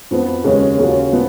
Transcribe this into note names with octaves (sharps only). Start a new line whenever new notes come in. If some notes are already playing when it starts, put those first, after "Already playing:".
F2 F3 B3
D#2 C#3 G#3 C#4
D#2 C#3 F#3 C#4 F4
A#2 F3 B3